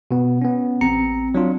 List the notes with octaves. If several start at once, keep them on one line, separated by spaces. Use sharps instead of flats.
B2 B3
B3 C#4
A1 C4 A#5 C#7
F#3 D4 F4